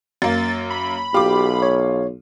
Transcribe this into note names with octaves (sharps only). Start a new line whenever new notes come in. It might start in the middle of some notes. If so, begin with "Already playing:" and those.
F#2 A#3 A6
B5
B1 F4 G4 D6
C#5